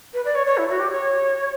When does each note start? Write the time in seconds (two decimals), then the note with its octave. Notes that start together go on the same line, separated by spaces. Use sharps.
0.13 B4
0.24 D5
0.35 C#5
0.46 C#5
0.57 E4
0.69 F#4
0.79 G4
0.91 C#5